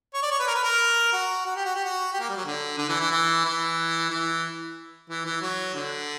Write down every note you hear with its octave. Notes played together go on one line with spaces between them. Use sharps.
C#5
D5
C#5
B4
A#4
B4
A#4
F#4
F#4
G4
F#4
G4
F#4
G4
A#3
G3
F#3
D3
D3
E3
E3
E3
E3
E3
E3
E3
F#3
D3